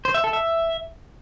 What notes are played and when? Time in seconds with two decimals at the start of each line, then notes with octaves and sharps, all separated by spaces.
0.05 C5
0.14 E5
0.24 A4
0.33 E5